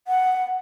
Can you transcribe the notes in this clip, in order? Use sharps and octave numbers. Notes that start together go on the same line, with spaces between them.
F#5